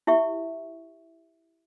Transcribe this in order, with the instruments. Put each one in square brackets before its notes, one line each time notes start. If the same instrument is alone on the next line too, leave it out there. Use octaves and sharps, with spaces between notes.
[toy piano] E4 G4 E5 C#6